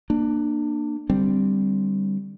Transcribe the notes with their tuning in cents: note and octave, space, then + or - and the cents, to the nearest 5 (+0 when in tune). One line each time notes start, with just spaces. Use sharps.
A#3 +0 D4 +25
D3 +0 G3 +0 C4 -10